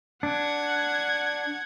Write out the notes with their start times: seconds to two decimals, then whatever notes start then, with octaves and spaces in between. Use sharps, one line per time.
0.23 D4 F#5 G#6